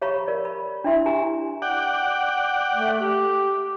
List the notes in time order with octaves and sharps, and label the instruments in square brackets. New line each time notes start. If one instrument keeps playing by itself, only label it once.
[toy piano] G4 C#5 F5 A#5 B5 C#6
A#4 D5
B5
D4 E4 E5 C6
G4 G#5 A#5
[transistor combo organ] D5 F#5 G5
[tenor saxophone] A3
G4